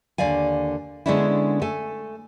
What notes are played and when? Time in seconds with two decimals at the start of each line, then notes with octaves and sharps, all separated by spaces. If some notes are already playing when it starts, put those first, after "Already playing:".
0.18 D#2 D3 D5 F5 G#5
1.06 D3 G#3 B3 C#4 D4 E4
1.62 A3 A4 G#5